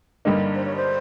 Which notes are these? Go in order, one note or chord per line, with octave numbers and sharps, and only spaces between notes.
G2 D3 G3 A#3 D#4
C5
C#5
C5